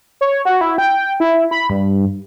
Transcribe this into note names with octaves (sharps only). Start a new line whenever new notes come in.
C#5
F#4
E4
G5
E4
B5
G2